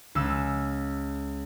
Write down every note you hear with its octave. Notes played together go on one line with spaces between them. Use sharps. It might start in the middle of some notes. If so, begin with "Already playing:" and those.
C#2 E6